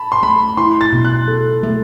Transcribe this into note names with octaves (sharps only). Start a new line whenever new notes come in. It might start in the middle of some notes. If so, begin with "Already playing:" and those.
Already playing: A5 B5
C6
A3 B5
E4 C6
A6
B2
F#6
A4
A3